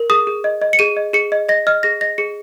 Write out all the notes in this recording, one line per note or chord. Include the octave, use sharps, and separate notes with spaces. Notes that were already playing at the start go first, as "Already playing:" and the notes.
Already playing: A#4
G#4 D#6
G#4
D#5
D#5
C#7
G#4 D#7
D#5
G#4 C#7
D#5
D#5 A#6
D#5 F6
G#4 A#6
D#5 A#6
G#4 C#7